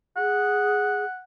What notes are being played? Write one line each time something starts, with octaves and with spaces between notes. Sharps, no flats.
G#4 F#5